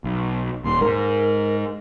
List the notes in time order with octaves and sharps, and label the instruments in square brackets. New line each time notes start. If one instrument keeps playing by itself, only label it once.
[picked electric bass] B1
[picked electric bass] D#1 D#2 [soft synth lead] C6
[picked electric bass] G#2 [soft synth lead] A#4